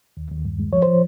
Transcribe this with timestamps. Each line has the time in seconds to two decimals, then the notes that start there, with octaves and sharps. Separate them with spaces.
0.17 D#2
0.31 D#2
0.45 G2
0.60 G#3
0.73 F3 C#5
0.83 C5
0.87 F3